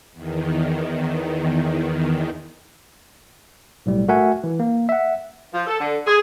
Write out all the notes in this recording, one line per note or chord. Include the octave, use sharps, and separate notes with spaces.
E2 D#3
B1 A2 G3
A3 F#4 A#4 E5 F#5 G#5
E3
A#3
E5 F#5
F3
A4
D3
G#4